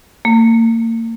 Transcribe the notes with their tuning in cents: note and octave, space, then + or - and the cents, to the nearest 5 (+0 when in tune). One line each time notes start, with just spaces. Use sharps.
A#3 -35